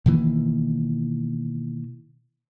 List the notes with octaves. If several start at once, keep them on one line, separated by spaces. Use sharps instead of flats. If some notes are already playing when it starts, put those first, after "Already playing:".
B2 D#3 E3 A#3